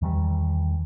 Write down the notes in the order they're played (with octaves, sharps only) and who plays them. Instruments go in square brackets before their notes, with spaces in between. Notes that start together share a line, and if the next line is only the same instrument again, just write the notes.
[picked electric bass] E2 D#3 E3 G3